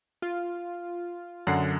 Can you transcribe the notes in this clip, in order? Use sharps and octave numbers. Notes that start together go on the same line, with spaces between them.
F4
F#2 D3 F#5 C7